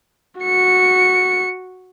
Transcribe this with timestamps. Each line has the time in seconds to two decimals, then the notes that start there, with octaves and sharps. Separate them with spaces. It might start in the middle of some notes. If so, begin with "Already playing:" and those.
0.41 F#4 C#7